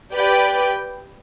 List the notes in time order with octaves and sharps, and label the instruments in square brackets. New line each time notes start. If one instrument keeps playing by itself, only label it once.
[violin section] G4 B4 D5 G5